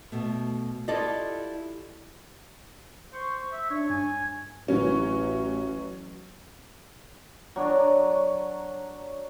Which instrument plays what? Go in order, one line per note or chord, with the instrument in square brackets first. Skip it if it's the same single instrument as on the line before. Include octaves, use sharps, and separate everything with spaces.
[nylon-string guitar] B2 A3
E4 F4 G4 A4 D5 D#5
[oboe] C5 [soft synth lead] C#6
[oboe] E5
[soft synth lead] D4 [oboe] C#5
[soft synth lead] G2 [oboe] G#5
[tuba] A1 [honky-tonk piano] E3 F#3 C#4
[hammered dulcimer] F#3 D4 C#5